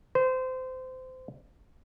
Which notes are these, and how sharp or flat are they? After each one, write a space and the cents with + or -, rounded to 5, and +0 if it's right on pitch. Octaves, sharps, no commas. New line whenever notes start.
C5 -25